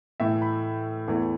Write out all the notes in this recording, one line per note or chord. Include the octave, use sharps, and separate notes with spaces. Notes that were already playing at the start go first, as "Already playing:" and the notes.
A2 E3 A3 E5
B5
E2 E3 A3